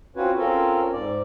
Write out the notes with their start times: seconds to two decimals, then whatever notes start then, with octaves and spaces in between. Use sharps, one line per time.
0.16 C4 C#4 F4 F#4 B4 C#5
0.38 C4 C#4 F4 A4 A#4
0.93 G#2 D5